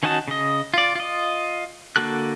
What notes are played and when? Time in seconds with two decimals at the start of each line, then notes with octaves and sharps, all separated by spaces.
0.03 D#3 C#4 D#4 F#4 A5
0.28 C#3 D#5
0.74 F4 D5
0.95 F4 D#5
1.96 D3 A#3 F#4 A4 F#6